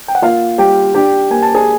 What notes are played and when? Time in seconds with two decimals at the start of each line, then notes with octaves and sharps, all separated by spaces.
0.08 G5
0.15 F#5
0.22 A#3 F4 F5
0.58 G3 G4 G5
0.95 D4 G4 G5
1.30 A#3 G#5
1.43 A5
1.55 G#4 G#5